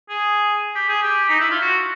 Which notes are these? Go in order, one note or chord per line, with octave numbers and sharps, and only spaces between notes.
G#4
G4
G#4
G4
D#4
E4
F4
F#4